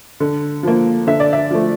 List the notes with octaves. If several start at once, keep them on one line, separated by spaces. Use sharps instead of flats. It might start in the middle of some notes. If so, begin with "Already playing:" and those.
D3
F3 A#3
D3 E5
D5
E5
F3 A3